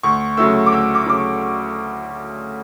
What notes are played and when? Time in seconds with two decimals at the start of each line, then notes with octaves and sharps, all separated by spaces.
0.03 D2 C#6
0.37 C#3 F#3 A3 E6
0.66 D6
0.72 D2 E6
0.95 D6
1.06 C#3 F#3 A3 D6
1.18 C#6